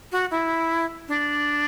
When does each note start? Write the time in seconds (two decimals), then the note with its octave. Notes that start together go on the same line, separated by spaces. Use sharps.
0.12 F#4
0.31 E4
1.08 D4